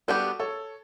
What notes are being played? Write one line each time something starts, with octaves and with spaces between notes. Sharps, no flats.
G3 B3 D4 F#4 G4 A4
A4 C#5